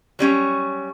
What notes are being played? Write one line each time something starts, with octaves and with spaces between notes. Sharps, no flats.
F#3 G3 C#4 C#5